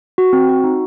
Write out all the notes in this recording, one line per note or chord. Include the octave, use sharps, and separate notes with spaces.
F#4
C4
F#4
D#4